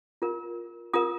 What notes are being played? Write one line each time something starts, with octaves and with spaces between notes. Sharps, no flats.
F4 A#4
F4 A#4 D#6